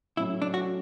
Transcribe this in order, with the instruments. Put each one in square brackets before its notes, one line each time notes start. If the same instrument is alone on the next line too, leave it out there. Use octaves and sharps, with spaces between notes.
[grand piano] A2 F#3 C#4 [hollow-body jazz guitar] E4
[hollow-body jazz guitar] D4
F#4